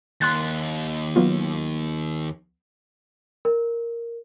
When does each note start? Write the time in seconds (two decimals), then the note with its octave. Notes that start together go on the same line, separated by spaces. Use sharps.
0.21 D#2 C6 F#6 A6
1.16 F#3 B3 F4
3.45 A#4